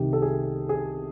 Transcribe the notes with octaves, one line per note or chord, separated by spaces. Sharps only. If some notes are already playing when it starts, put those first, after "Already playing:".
Already playing: C2 C3 D#3 G4
A4
G#4
G#4